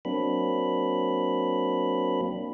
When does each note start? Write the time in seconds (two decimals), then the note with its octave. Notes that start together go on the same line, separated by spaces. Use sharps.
0.05 F#3 A#3 C4 D4 B5